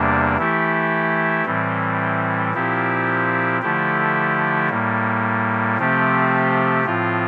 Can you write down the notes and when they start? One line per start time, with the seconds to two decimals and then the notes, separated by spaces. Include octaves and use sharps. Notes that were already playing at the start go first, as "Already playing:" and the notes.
Already playing: E2 C3 G3 A#3 D4
0.38 E3 A3 E4 G4
1.45 A2 E3 G3 C4
2.53 A#2 F3 C4 E4 G4
3.61 D3 F3 A3 E4 G4
4.69 A2 G3 A#3
5.78 C3 F3 A3 C4 G4
6.85 A2 F3 C4 F4